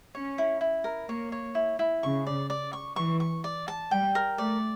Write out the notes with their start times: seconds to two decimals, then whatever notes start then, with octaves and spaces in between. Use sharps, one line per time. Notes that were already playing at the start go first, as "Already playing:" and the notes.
0.14 C#4 C#5
0.38 E4
0.61 E4
0.84 A#4
1.09 A#3 C#5
1.32 C#5
1.55 E4
1.79 E4
2.03 C#3 C#6
2.27 D5
2.50 D5
2.73 C#6
2.96 E3 C#6
3.20 C#6
3.44 D5
3.68 A5
3.91 G3 G5
4.15 A#4
4.38 A3 D5